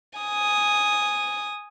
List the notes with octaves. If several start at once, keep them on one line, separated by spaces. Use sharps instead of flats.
G#5 D#6